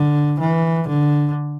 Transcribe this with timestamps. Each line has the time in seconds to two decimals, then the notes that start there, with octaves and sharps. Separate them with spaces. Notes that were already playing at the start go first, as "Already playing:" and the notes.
Already playing: D3
0.40 E3
0.88 D3